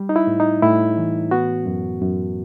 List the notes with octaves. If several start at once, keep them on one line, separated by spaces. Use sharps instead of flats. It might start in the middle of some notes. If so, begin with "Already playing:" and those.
Already playing: G3
D#4
E4
A2
D#4
A2 E4
E3
B3 F#4
F#2
F#2